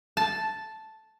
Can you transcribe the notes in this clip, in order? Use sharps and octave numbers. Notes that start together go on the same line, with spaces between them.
A5